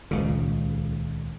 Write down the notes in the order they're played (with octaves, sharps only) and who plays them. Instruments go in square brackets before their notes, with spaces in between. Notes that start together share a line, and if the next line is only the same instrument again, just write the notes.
[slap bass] D#1 C#2 C#3